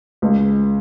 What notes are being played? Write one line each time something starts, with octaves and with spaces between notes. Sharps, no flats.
C#2